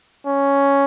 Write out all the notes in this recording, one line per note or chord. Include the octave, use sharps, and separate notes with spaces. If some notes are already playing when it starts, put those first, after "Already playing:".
C#4